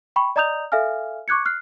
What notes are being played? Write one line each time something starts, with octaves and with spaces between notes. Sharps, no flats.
G5 B5 C#6
D5 D#5 A#5 D#6 G6 F7
A4 E5 F5 G#5 F6
C#6 D6 F#6 G#6 C#7
F6 F#6 C7